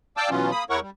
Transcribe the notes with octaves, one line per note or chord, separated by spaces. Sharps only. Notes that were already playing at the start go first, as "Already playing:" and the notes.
D5 F5 G5 A5 D6 E6
B2 E3 F#3 B3 C#4 F4
A#3 B5 D#6
E2 E4 A#4 C#5 F#5 C#6
G3